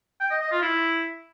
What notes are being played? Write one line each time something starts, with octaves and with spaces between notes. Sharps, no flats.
G5
D#5
D#5
F4
E4